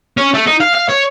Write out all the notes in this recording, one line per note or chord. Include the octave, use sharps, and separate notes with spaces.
C#4
A3
D#4
F5
F5
C#5